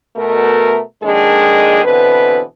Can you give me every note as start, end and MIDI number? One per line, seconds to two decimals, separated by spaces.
0.16 0.79 47
0.16 0.79 57
0.16 0.79 70
1.02 1.81 41
1.02 1.81 46
1.02 1.81 51
1.02 1.81 56
1.02 1.81 62
1.02 1.81 68
1.84 2.42 47
1.84 2.42 50
1.84 2.42 52
1.84 2.42 60
1.84 2.42 71